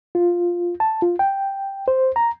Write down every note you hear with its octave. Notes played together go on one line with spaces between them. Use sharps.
F4
A5
F4
G5
C5
A#5